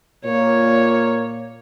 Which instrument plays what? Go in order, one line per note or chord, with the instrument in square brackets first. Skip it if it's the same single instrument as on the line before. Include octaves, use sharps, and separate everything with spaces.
[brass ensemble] A#2 A#3 [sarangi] C#5